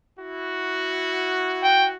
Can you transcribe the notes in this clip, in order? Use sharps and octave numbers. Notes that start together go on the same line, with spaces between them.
E4 F#4
G5